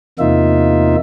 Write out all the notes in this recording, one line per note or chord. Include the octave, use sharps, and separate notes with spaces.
E2 C3 A#3 D#4 F4 E5